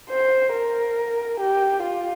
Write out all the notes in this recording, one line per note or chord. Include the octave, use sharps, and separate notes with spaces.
C5
A#4
G4
F4